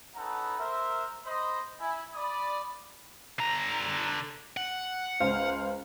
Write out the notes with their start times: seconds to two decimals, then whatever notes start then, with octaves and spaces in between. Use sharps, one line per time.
0.15 C#4 D#4 A4 B4 F#5 A#5
0.59 A#4 C5 E5
1.26 C5 D#5 B5
1.79 E4 G#5
2.15 D5 B5 D#6
3.39 D3 A#5
4.57 F#5
5.20 C#2 C5 F5